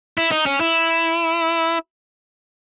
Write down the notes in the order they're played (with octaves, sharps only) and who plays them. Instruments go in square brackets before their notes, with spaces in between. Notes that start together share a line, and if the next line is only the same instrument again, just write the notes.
[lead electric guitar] E4
D#4
C#4
E4